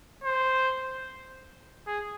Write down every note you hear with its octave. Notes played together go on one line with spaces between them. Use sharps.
C5
G#4